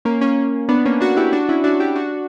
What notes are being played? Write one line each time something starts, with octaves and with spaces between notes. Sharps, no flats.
A#3 C#4
A#3 C#4
B3 D4
A#3 C#4
D4 F#4
E4 G4
D4 F#4
C#4 E4
D4 F#4
E4 G4
D4 F#4